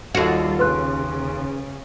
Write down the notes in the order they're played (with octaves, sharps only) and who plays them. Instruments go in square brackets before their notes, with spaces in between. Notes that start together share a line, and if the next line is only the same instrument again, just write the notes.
[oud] D#2 F#4 [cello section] G3 F4 A4
[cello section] C#3 [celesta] B4 C6 F#6